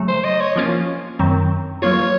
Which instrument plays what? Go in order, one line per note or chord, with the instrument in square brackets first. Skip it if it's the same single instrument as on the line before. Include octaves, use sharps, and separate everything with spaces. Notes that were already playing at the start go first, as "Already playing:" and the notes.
Already playing: [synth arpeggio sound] C#3 F#3 A3
[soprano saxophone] C5
D#5
C#5
[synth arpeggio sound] F3 A#3 C#4 F4
F#2 D#3 F#3 C4
[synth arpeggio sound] F#3 A#3 F4 [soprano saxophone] C#5